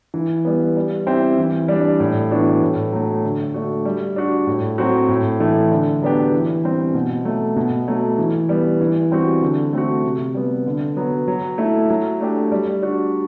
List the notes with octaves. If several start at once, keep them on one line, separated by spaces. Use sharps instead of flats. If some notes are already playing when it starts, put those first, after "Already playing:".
E3
G3 B3
G3
C4 E4 G4
E3
G3 D4
A2
E3 B3 D4 F#4
A2
F#3 A3
D3
A3 D4 F#4
G3
D4 F#4
A2
F#3 C4 F#4
A2
E3 A3
D3
F#3 B3 D4 G4
E3
G3 C4
B2
F#3 A3
B2
F#3 A3
E3
G3 B3
E3
G3 C4 F#4
D3
A3 C4 F#4
C3
G3 B3
D3
F#3 B3
F#3
A3 E4
F#3
A3 D4 G4
G3
D4 F#4